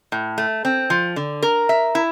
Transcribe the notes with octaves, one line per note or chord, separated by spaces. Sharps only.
A2
A3
C4
F3
D3
A#4
E5
E4